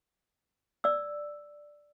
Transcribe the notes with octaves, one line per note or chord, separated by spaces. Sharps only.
D5 E6